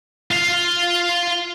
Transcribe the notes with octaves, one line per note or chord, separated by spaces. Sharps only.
F4 F5